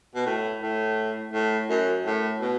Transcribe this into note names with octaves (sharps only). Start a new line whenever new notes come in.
B2
A2
A2
A2
F#2
A2
B2